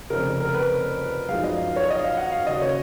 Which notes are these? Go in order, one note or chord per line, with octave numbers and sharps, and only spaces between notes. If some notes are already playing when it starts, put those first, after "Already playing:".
F1 F2 C#3 A#4
A#4
B4
F#2 F3 G#3 D#4 F5
D#5
C#5
D#5
F5
F#5
F5
D#2 C#3 F#3 C#4 D#5
C#5